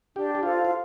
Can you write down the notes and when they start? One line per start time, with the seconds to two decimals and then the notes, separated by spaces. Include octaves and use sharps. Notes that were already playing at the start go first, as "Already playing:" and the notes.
0.16 D4 G4
0.35 G4
0.43 F4 A4 C5 F5
0.65 F4